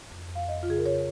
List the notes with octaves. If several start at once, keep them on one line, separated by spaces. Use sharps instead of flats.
F2
F2
F5
F2 D#5
F4
C#3 G#4
A#4
C#3 C#5